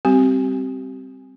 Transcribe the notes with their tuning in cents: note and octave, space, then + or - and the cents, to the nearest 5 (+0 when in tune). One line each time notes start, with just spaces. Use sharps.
G3 +0 C4 -5 G4 -30